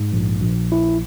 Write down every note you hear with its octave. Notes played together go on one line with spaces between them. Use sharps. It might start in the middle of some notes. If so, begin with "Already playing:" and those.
Already playing: G#2
A#1
A#1
E4